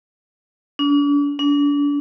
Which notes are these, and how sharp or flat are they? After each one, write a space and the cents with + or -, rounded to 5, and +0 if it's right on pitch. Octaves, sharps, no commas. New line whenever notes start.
D4 -40
D4 -35